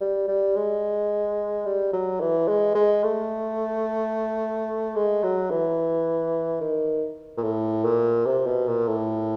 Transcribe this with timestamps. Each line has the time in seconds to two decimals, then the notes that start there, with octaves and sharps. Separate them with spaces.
0.01 G3
0.28 G3
0.56 G#3
1.66 G3
1.93 F#3
2.20 E3
2.48 G#3
2.75 G#3
3.03 A3
4.96 G#3
5.23 F#3
5.50 E3
6.61 D#3
7.37 A#2
7.43 A2
7.84 A#2
8.26 C3
8.46 B2
8.68 A#2
8.87 A2